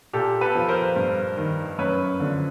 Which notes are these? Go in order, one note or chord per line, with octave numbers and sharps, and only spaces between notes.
A#2 G4 A4
A4 B4
F3
A#4 C5
G2
D#3
F#2 B4 C#5
D3 F3